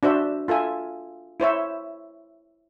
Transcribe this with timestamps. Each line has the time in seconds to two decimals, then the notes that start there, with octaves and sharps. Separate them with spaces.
0.03 D4 F#4 C5 E5
0.48 F4 A4 E5 G#5
1.40 E4 C5 C#5 E5